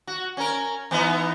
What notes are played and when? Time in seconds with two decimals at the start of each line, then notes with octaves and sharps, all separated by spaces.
0.07 F#4
0.37 C#4 A#4
0.91 E3 B3 D#4